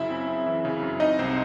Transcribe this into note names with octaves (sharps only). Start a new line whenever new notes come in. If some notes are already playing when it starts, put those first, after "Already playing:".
Already playing: F#2 C#3 E4 E5
C4
C4
E3
C#3
F#2
C4 D#4 D#5
C2 C4 C5